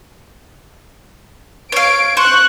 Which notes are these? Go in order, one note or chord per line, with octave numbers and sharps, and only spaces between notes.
C#5 F5 D7
C5 C#6 F#6